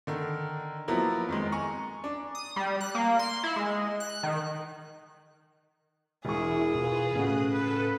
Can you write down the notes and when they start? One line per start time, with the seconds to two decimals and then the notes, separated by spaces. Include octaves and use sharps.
0.07 D3 D#3
0.88 F3 F#3 A#3 B3 E4
1.28 F2 D#3 G#3
1.52 G#5 A#5 C#6
2.04 D4
2.35 D#6
2.56 G3
2.81 F#6
2.95 A#3
3.19 C6
3.44 E4
3.56 G#3
4.00 F#6
4.23 D#3
6.25 E1 E4 G#4 C#6
6.75 B2 F4 B4
7.15 A2 C#3 A3 F#4 D#6 F#6
7.52 A4 B4